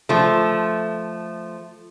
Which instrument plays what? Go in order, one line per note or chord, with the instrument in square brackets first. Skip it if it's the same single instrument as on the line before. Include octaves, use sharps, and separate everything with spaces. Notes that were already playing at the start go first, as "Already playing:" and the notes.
[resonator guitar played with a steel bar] F3 A3